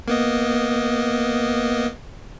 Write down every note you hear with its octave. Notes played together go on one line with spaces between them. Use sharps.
A#3 B3 D#5